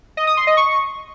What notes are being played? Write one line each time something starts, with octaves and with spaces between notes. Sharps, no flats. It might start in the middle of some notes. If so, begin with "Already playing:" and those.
D#5
D#6
C6
D#5
C#6